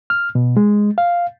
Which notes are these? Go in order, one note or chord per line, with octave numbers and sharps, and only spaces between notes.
F6
B2
G#3
F5